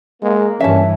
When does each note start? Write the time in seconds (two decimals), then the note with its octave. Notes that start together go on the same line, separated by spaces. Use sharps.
0.23 G#3 A#3
0.60 G2 E3 C#4 E5 A5